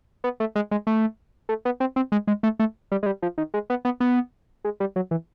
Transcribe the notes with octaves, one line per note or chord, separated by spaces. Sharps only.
B3
A3
G#3
G#3
A3
A3
B3
C4
C4
G#3
G#3
A3
A3
G3
G#3
G3
F3
D#3
G#3
B3
B3
B3
G#3
G3
F#3
E3